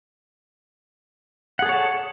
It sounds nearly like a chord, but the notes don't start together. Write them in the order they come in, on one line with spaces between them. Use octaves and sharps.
F#5 G#4 A4 C#5 A5